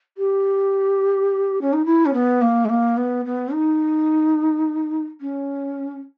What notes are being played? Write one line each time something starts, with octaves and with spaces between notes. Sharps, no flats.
G4
C#4
D#4
E4
C#4
B3
A#3
G#3
A#3
B3
B3
D#4
C#4